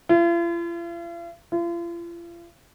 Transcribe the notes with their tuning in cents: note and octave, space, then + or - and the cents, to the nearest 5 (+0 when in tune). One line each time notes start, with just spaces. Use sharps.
F4 -45
F4 -40